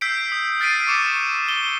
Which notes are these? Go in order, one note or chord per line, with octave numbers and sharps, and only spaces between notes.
E6 G6 B6 C7 D7
D#6
F6 A6 B6 C7 D7 D#7
C#6 D6 C#7 E7
G7